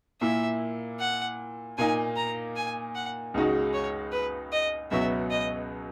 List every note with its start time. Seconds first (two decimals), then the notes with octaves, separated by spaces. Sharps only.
0.21 A#2 A#3 E4 E5
1.00 F#5
1.78 A#2 A#3 D#4 G#5
2.17 A#5
2.56 G#5
2.95 F#5
3.34 C#2 C#3 G#3 D#4 F#4
3.73 C#5
4.12 B4
4.52 D#5
4.91 C#2 B2 F#3 B3 F#4 E5
5.31 D#5